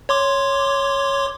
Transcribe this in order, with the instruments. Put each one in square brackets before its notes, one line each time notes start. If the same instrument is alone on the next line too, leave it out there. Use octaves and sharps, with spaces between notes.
[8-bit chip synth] C#5 C6 D6